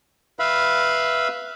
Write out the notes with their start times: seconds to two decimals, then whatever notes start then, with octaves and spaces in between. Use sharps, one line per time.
0.39 B4 E5 F5 B5